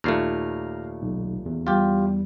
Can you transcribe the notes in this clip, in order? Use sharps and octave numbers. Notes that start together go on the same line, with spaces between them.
D#2 A#2 A3 A#5 F6 C7
B1
E2
G3 F4 G4